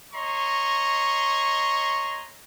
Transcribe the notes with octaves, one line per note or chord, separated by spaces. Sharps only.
C#5 D#5 A#5 C6 C#6